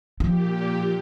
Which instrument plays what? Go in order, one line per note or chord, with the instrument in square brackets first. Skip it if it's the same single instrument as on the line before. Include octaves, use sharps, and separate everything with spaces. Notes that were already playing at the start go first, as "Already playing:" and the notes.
[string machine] A#2 G4 [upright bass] F3